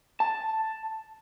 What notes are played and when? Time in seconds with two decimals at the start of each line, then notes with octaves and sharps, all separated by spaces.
0.20 A5